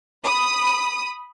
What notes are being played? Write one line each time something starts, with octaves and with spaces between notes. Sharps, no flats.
B5 D#6